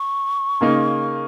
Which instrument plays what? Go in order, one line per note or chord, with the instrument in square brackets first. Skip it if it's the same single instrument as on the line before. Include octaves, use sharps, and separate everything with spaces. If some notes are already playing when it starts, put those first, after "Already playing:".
Already playing: [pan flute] C#6
[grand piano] C#3 A#3 D#4